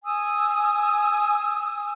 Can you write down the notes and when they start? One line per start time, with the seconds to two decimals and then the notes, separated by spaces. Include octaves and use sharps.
0.04 G#5 D#6 E6